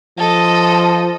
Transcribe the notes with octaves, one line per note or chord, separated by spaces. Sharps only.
F3 A4 D#5